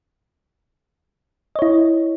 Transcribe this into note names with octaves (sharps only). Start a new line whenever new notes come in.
E4 C#5 D#5